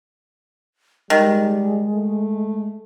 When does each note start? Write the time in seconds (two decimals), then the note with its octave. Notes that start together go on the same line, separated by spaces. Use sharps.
1.10 D#3 G3 G#3
1.94 A3